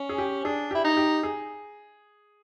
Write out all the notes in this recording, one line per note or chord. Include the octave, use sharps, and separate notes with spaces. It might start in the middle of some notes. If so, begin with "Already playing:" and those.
Already playing: C#4
G#4
G4
D4 G#4
E4 G4
D#4
G4
G#4